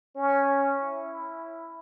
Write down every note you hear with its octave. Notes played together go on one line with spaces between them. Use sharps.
C#4
E4